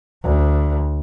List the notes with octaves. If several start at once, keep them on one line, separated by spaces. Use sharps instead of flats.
D2